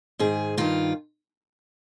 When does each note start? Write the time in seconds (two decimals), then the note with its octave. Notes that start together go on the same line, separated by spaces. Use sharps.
0.19 G#2 D#3 G#4
0.57 G2 D#3 F4